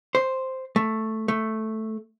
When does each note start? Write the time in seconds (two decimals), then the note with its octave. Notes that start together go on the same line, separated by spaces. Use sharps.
0.15 C5
0.76 A3
1.28 A3